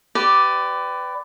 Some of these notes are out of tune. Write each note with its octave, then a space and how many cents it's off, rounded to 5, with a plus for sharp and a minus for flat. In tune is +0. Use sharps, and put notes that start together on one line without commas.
G4 -10 B4 +25 D5 +0